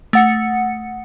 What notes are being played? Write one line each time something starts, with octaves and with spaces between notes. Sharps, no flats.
A3 F#5 C#7